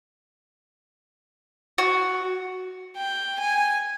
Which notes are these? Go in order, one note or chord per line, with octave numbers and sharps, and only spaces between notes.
F#4
G5
G#5